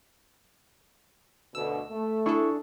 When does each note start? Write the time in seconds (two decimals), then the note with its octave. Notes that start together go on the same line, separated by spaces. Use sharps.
1.55 D2 B2 D3 E6
1.90 A3
2.26 D4 E4 G#4 A4 C#6